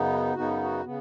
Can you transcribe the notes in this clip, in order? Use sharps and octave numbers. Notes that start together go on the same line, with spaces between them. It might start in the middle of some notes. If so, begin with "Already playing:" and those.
Already playing: F#2 C#3 B3 D#4
F#2 C#3 B3 D#4 F#4
F#4
C#3 B3